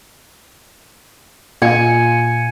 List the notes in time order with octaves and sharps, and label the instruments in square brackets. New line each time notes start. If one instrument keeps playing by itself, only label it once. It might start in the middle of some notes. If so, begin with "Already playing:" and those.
[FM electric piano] A#2 F4 C#7 [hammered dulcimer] G#5